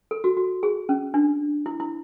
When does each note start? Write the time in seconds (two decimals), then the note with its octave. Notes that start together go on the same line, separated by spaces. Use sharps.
0.11 A4
0.24 F#4
0.37 F#4
0.63 G#4
0.89 C#4
1.14 D4
1.66 E4
1.80 E4